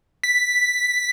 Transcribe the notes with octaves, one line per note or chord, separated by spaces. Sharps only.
B6